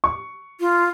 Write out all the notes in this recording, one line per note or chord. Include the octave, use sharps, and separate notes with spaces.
C#6
F4